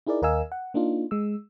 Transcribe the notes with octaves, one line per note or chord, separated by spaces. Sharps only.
D#4 E4 G#4 A#4 D5
D#2 A#4 D#5 F5 G#5 E6
F#5
A#3 D4 D#4 F4
G#3 E6